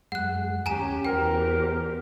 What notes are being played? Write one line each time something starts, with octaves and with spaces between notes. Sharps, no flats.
F#2 G#3 F#5 F#6
D#2 C#4 G4 G#5 A#5 E7
E2 F#4 G4 A#4 C5 G5